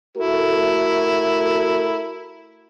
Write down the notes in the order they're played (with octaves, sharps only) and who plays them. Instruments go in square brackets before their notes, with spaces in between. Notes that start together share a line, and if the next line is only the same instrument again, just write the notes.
[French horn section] A3 F#4 A#4 [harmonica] E4